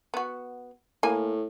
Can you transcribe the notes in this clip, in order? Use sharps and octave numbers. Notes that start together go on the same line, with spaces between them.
B3 F#4
A2 A#3 G#5